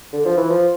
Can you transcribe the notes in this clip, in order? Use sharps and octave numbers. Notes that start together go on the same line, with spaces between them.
D3
F3
E3
F3